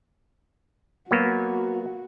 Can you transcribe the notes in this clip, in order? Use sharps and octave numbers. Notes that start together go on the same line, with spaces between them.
F#3 A#3 B3 F#4